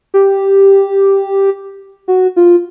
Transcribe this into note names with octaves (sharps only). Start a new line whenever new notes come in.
G4
F#4
F4